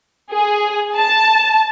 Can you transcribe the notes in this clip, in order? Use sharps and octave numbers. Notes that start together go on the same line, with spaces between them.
G#4
A5